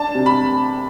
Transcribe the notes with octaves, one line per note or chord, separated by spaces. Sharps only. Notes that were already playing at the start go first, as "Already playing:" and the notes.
Already playing: D4 A5
C3
B5